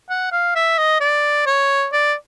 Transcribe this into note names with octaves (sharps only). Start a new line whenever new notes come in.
F#5
F5
E5
D#5
D5
C#5
D5